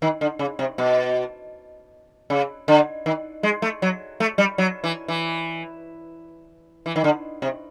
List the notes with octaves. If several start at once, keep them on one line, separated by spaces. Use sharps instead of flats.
D#3
D3
C#3
C3
B2
C#3
D3
D#3
G#3
A3
F#3
A3
G3
F#3
E3
E3
E3
D#3
D3
C3